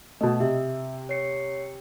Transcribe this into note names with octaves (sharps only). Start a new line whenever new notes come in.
B2 A3 D#5
C3 E5
C#5 C7 C#7